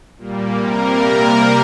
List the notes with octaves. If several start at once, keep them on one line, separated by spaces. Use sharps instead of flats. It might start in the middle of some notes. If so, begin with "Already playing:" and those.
A#2 G3 A#3
C3 G3 A#3 A#4